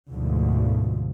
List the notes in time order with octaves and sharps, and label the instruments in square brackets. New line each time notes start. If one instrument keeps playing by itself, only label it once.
[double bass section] D2 G#2 B2 D3 F3